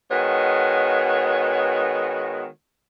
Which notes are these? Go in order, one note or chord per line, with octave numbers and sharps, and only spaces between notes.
D#3 G#3 B3 F#4 C#5